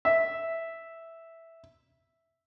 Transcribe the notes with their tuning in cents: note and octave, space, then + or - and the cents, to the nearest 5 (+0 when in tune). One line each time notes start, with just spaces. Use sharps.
E5 +0